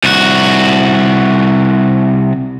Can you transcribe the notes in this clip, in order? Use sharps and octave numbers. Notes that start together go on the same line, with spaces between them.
C2 F#4